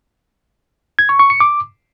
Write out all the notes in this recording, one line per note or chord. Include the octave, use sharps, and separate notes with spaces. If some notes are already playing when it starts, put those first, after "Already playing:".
G#6
C#6
C#6
C#7
D6